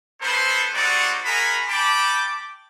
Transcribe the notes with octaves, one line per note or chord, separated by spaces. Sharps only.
B3 C#4 A4 B4 C5
G3 G#3 C4 D#4 F#4 D5
D#4 F#4 G#4 A#4 G#5 B5
C#4 G5 A5 B5 D6